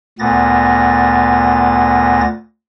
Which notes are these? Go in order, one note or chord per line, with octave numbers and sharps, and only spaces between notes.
D2 A#2 B3 A6 A#6